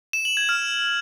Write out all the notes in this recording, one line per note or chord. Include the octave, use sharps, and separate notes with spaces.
E7
F#7
G#6
F6